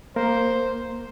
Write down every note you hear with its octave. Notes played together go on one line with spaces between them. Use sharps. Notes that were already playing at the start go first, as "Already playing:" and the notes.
A#3 A#4 C5